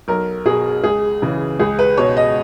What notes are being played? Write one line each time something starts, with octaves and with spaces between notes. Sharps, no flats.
B1 A#4
B2 G#4
C#2 G#4
C#3 E3
C#2 G#4
B4
B2 C#5
D#5